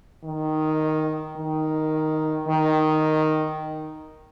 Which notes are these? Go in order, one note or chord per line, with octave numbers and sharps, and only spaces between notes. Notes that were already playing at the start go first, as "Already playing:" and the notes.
D#3
D#3
D#3